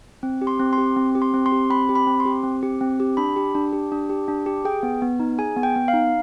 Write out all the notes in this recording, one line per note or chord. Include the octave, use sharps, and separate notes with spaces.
C4
G4
C6
C4
C6
G4
C4
G4
C6
C4
C6
G4
C4 B5
G4
B5
C4
C6
G4
C4
G4
C4
G4
D4 B5
G4
D4
G4
D4
G4
D4
G4
G#4 G5
B3
B3
D#4
G#4 G#5
B3
G5
B3
F5
D#4